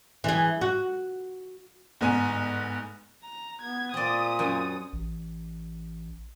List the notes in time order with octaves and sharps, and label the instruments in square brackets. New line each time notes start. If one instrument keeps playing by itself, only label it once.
[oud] E3 G#4
F#4
[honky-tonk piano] G1 G#2 B3 G#5 D#7
[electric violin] A#5
[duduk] B3 [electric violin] G#6
[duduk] A#2 [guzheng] C4 D5 [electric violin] D#6
[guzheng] F#2 G5 G#5
[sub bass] A1